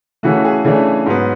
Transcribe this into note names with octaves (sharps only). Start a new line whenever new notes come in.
C#3 E3 A3 F#4
G#4
C#3 E3 A3 D4
G#2 F#3 B3